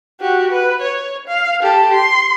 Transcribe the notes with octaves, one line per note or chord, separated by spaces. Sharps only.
F#4 G4
B4
C#5
F5
G4 A4
C6